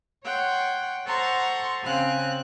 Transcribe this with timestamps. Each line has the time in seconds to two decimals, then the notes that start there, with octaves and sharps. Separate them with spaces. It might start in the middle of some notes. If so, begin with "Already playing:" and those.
0.25 C#5 F#5 G5 C6
1.07 A4 C5 F#5 A#5 C6 C#6
1.83 C#3 C4 F5 G#5 F#6